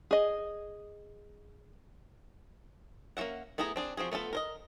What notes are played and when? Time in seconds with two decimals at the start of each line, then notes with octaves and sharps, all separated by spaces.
0.11 G#4 D#5
3.17 A#3 C#4 F#4 E5 F#5
3.58 A3 B3 E4 G#4 A#5
3.76 C4 D4 G#4
3.97 F3 C4 F#4 G#4
4.12 A3 B3 F4 A4
4.33 A#4 C5 D#5